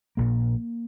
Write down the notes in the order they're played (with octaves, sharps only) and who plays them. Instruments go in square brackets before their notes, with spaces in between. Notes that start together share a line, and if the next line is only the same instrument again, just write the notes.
[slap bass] A#1 A#2 A#3